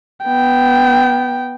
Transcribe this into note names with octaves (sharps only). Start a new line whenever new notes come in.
B3 G5